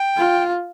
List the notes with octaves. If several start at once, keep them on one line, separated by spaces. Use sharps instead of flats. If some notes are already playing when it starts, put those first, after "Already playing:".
Already playing: G5
F4